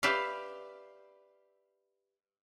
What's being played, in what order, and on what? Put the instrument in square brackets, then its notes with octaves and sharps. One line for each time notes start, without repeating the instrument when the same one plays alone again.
[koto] G4 B4 D5 E5 F5